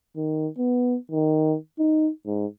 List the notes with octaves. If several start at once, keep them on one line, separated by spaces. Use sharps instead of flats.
D#3
B3
D#3
D#4
G#2